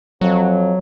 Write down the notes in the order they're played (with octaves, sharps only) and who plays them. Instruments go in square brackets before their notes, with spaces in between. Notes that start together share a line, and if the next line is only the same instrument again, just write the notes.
[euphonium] F2 [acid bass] F#3